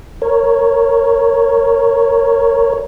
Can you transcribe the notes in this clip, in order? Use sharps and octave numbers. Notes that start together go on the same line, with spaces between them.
A#4 C#5